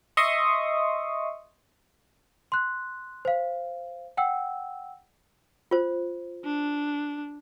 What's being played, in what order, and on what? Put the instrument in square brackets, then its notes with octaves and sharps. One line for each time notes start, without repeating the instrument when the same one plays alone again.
[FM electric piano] D#5 E5 C6 C#6 D#6
[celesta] C6 F#6
C5 F5
F#5 G5 E6
[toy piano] F4 C5
[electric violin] D4